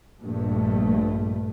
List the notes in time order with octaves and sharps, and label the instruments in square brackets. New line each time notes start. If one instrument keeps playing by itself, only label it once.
[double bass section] A#1 G2 A3